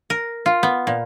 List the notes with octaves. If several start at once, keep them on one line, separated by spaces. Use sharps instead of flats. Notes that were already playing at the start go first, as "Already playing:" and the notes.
A#4
F4
B3
A#2